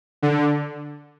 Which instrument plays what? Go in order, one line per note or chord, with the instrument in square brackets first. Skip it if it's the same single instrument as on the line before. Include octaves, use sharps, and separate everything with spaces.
[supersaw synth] D3